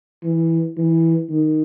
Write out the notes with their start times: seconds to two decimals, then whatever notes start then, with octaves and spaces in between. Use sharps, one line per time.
0.24 E3
0.77 E3
1.30 D#3